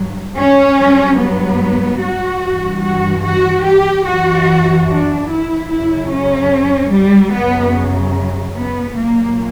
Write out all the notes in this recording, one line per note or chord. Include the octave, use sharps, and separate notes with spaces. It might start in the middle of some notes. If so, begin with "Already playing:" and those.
Already playing: G2 F#3
C#4
G2 F#3
B3
F#4
G2 E3
F#4
F#4
G4
F#2 E3 F#4
D4
E4
F#2 C#3 F#3 E4
C#4
G3
F#2 C#3 F#3 B3
B3
A#2 F#3 A#3